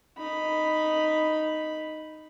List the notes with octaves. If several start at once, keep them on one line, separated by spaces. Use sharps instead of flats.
D#4 B5